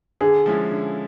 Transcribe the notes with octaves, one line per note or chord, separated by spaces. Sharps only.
D3 G#4
F3 G#3 C#4 E4
D3